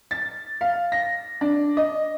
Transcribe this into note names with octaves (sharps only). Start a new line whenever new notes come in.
A6
F5
A#6
D4
D#5